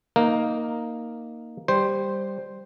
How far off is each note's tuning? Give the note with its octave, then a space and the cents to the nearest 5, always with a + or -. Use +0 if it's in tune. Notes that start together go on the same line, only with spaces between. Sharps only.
A#3 +0 D#4 +0 A#4 +0
G3 +5 C5 +0